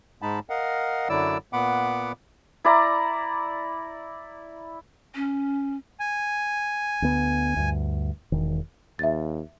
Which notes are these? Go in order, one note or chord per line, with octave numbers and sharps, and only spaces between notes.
G#2 G#3 D#4 A5 B5
A#4 D#5 F5 F#5
F#2 D3 F#3 E4 D5 E6
A#2 B3 F#5 B5 D6
E4 D5 A#5
C#4
G#5
D2 D3 B3
D2 G2
E1 D#3
D#2 E5 A6